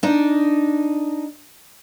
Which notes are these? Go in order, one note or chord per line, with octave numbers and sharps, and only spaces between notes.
D4 D#4